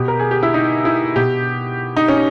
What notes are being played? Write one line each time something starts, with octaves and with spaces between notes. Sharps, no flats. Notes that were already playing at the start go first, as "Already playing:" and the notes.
Already playing: B2 G4
A#4
G#4
G4
E4
D#4
E4
B2 G4
D#4
C#4